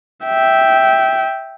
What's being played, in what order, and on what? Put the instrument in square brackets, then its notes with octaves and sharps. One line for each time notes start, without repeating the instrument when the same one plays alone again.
[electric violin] E5 G5